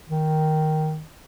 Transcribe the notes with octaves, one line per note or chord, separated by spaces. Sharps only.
D#3